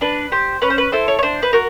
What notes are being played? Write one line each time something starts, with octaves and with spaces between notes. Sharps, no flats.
D4 B4
G4 C5
C#4 B4
C5
B4
E4 A4 C5
C#5
C#5
D4 C5
B4
F#4 A#4